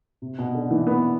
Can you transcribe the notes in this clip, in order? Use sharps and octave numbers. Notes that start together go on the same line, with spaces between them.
C3
B2
D3
E3
B3